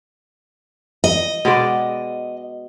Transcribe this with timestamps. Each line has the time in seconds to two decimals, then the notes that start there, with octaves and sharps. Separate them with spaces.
1.04 D#5
1.45 B2 G#3 D5